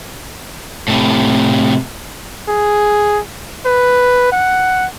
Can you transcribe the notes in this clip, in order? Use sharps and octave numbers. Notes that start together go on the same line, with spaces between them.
A2 C3
G#4
B4
F#5